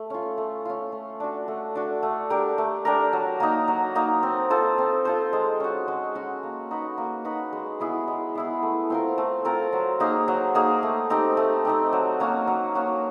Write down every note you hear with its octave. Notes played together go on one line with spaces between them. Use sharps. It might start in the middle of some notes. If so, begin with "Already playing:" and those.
Already playing: A3
C#4 F4
A3
C#4 F4
A3
D4 F#4
A3
D4 F#4
A3
D4 G4 A#4
A3
D4 G4 A#4
F#3
A#3 D#4
F#3
A#3 D#4
C4
F4 A4 C5
C4
F4 A4 C5
G#3
C#4 F#4
G#3
C#4 F#4
A#3
D#4 F#4 B4
A#3
D#4 F#4 B4
G#3
B3 E4 G#4
G#3
B3 E4 G#4
A3
C4 F4 A#4
A3
C4 F4 A#4
F#3
A#3 D#4 G#4
F#3
A#3 D#4 G#4
A3
C4 D#4 G4
A3
C4 D#4 G4
F#3
A#3 C#4 F#4
F#3
A#3 C#4 F#4